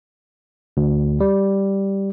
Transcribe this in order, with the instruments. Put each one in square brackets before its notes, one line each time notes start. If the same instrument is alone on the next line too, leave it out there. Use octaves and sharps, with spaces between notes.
[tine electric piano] D2
G3